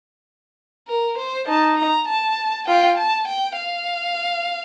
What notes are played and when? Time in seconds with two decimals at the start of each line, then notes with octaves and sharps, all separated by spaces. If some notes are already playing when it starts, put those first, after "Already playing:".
0.88 A#4
1.18 C5
1.47 D#4 A5
1.78 A#5
2.08 A5
2.68 F4 G5
2.98 A5
3.28 G5
3.58 F5